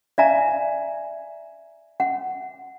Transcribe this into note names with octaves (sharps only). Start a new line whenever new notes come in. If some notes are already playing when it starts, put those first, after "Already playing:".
D5 E5 F5 G#5 A#5
F#5